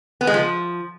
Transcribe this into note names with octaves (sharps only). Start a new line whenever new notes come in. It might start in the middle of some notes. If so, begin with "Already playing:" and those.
B3
G#3
F3